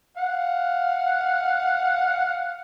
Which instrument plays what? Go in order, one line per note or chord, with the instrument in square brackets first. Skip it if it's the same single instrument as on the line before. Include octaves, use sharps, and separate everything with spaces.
[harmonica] F5 F#5